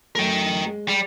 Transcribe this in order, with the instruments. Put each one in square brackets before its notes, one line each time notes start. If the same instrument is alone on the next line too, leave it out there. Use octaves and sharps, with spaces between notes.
[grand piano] F#2 A3 [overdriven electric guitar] A#4 G5
[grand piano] G#3
[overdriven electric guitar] G3